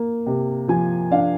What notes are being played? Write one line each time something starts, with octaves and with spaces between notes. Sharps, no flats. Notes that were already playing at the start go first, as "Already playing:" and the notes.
Already playing: A#3
C3
F3 G#5
D4 F5